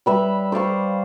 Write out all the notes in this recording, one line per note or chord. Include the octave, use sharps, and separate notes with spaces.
G3 B4 E5
C5 D5 F5 C#6